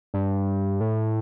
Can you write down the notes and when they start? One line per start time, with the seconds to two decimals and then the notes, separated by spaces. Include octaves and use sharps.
0.14 G2
0.81 A2